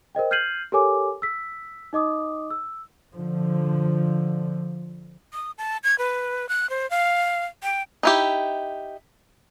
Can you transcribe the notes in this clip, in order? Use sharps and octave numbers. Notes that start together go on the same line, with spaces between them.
A#4 C5 D#5 G5
F6 G6 G#6 C7 D#7 F#7
G4 A4 A#4 C#5 G#5 D6
E6 B6
D#4 D#5 D6 D#6
E6
D3 F3
D#6
A5
G#6
B4
F#6
C5
F5
G5
D#4 E4 G4